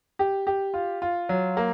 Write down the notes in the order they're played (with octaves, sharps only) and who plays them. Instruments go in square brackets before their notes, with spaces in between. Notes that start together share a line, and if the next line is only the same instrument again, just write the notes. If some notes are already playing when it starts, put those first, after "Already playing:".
[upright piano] G4
G4
F4
F4
F#3
A#3